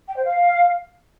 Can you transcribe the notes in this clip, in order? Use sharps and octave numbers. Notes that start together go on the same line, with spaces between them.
G5
C5
F5